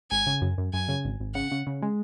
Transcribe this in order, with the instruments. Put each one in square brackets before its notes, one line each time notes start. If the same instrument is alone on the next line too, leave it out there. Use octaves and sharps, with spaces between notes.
[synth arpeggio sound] G#1 [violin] G#5
[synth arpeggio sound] C#3
F#2
F#2
[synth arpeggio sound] F#2 [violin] G#5
[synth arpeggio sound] C#3
G#1
G#1
[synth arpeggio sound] C#3 [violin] F#5
[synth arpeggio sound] C#3
C#3
G#3